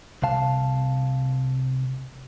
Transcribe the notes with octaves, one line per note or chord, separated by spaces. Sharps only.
C2 C3 F5 A5